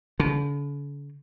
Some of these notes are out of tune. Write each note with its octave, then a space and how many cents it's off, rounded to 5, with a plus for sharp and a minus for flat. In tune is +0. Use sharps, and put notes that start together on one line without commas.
D3 -45